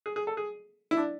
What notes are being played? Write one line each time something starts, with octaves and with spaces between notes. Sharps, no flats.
G#4
G#4
A4
G#4
E4
D4